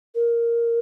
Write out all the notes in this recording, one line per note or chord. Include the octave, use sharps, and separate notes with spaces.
A#4